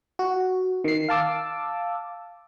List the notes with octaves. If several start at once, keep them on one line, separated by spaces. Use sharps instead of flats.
F#4
D#3 C7
F5 A5 D6 E6